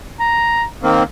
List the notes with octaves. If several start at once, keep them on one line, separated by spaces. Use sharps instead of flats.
A#5
D#3 A#3 C4 F5